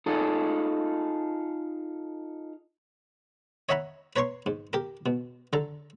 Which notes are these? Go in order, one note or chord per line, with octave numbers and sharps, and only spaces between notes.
D#4 F4 G#4 A4
C#5 D#5 E5 F#5 A#5 B5
B4 C#5 A#5 C6 C#6
G#2
G4 A#4
B2
D3 A4 A#5